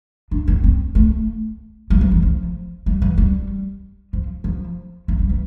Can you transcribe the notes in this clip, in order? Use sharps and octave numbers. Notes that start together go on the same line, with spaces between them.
D4
C4
C4
A3
G3
F3
E3
F3
G3
E3
G3
F3
F3
A3
G3
E3